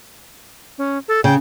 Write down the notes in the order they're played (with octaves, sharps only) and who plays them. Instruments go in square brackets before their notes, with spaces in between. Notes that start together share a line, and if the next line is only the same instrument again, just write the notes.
[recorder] C#4
A4
[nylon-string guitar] C#3 [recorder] G5